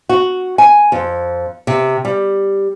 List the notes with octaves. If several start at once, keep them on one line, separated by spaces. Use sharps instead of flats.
F#4
G#5
F2
C3
G3